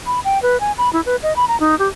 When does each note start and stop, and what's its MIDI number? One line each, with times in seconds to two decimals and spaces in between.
0.06 0.20 83
0.25 0.41 79
0.42 0.60 71
0.60 0.72 80
0.78 0.92 83
0.93 1.01 64
1.06 1.16 71
1.23 1.35 75
1.36 1.45 83
1.48 1.59 82
1.60 1.77 63
1.79 1.88 67